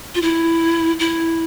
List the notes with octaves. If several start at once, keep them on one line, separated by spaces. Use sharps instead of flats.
F4
E4
E4